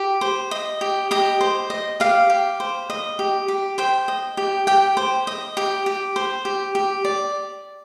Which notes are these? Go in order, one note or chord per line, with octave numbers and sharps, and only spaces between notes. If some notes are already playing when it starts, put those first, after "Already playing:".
Already playing: G4
C5
D#5
G4
G4 D#5
C5
D#5
G4 F5
G4
C5
D#5
G4
G4
C5 G5
D#5
G4
G4 G5
C5
D#5
G4
G4
C5
G4
G4
D5